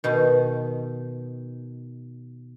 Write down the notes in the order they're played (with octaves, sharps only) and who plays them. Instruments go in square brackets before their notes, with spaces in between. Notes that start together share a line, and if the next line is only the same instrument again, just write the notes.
[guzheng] B2 D#3